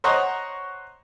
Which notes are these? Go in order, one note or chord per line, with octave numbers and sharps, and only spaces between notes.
C5 C#5 D#5 F#5 A#5